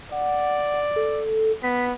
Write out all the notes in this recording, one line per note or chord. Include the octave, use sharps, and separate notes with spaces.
D5 F#5
A4
B3 B6